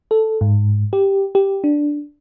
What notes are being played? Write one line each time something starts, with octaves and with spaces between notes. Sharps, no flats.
A4
G#2
G4
G4
D4